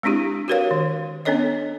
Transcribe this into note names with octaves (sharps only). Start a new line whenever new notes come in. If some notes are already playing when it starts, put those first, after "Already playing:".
G#3 C4 D4 E4 G4
F#4 G4 A#4 B4 C#5 F5
D#3
B3 C#4 D4 A4 C#5 D#5